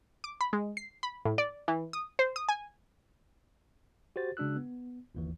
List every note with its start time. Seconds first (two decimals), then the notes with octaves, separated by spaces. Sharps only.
0.24 D6
0.41 B5
0.53 G#3
0.77 C7
1.03 B5
1.25 A2
1.38 D5
1.68 E3
1.93 D#6
2.19 C5
2.36 D#6
2.49 G#5
4.16 F#4 G4 C5 A6
4.37 C#3 G#3 D4 F#4 E6 F#6
4.56 B3
5.15 G1 D#2 E3